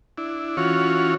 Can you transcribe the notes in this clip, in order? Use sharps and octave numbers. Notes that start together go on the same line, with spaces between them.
D4 E4
E3 C#4 F4 F#4 C#5